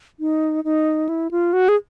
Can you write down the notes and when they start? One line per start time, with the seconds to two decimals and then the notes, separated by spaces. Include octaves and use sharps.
0.20 D#4
0.64 D#4
1.09 E4
1.31 F4
1.53 F#4
1.69 G#4